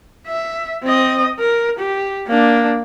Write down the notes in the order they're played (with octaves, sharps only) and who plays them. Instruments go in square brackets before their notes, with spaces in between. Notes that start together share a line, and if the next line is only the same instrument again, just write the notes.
[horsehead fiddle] E5
C4 D#5
A#4
G4
A#3 D4